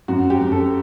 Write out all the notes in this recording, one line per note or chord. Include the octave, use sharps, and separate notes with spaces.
F#2 F#4
G4
F#2
A4